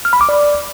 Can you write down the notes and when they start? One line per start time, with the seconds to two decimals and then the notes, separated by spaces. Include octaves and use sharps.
0.05 F6
0.13 B5
0.21 D6
0.29 D5